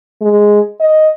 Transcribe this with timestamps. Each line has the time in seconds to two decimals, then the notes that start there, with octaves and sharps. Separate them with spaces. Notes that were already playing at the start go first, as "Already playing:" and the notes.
0.21 G#3
0.80 D#5